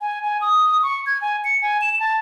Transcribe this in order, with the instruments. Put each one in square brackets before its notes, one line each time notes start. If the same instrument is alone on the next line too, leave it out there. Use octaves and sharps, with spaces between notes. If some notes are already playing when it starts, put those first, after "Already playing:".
[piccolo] G#5
G#5
D#6
C#6
G#6
G#5
C#7
G#5
E7
A5